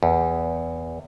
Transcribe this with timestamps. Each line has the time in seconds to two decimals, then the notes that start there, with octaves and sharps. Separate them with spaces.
0.03 E2